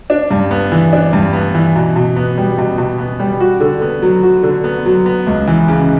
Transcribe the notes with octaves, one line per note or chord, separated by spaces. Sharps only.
D4
G2
B3
E3
D4
G2
B3
E3
B2
B2
B3
G3
B2
B2
B3
G3
F#4
D3
B3
F#3
F#4
D3
B3
F#3
B3
C#2
E3
C#3